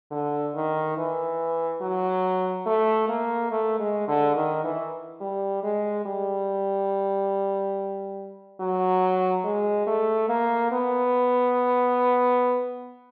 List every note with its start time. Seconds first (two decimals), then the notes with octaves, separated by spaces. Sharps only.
0.11 D3
0.55 D#3
0.97 E3
1.81 F#3
2.66 A3
3.09 A#3
3.51 A3
3.79 G#3
4.08 D3
4.36 D#3
4.64 E3
5.21 G3
5.63 G#3
6.06 G3
8.60 F#3
9.44 G#3
9.87 A3
10.29 A#3
10.71 B3